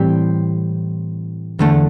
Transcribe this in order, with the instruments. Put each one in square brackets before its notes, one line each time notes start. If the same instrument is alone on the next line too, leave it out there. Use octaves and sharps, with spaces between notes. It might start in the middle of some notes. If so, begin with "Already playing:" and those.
Already playing: [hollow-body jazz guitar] A2 E3 G3 C4 G4
E2 D3 A3